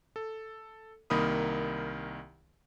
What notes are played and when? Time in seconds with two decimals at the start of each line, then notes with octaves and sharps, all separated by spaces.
0.16 A4
1.10 C2 D#3 A#3 A#4 B5 D#6